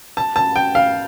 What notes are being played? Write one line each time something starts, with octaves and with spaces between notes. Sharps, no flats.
A5
A5
G5
F5